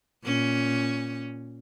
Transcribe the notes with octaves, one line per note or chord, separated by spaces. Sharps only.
A#2 C#4